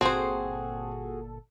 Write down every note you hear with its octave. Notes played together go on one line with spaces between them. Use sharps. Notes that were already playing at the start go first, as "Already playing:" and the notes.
G1 A#2 C4 F#4 G#4 A4 C5